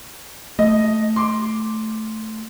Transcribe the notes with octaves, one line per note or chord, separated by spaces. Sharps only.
A3 D#5
C6 D6